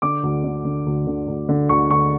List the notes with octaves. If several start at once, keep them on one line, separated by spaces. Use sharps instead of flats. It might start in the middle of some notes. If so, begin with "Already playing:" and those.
D3 D6
D2
D3
D3
D2
D3
D2
D3
D2 C#6
D2 C#6